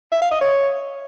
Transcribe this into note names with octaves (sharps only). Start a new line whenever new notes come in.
E5
F5
D#5
C#5